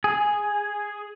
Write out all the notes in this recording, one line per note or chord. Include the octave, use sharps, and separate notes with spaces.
G#4